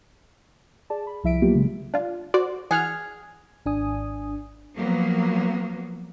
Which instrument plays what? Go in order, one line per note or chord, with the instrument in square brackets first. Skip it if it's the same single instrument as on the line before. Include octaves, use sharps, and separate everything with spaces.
[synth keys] G#4 D5 A5
B5
C2 F3 E4 E5 B6 D7
F#3 A#3 B3 F4 G4
C#3 G#3
[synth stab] D4 F4
F#4 C5 D5
[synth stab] E3 F#5 F6 [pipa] G#4
[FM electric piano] G#1 D4 G#5 D#6
[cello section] F3 F#3 A#3 B3